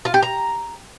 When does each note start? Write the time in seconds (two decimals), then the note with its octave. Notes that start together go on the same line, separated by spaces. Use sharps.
0.05 F4
0.14 G4
0.23 A#5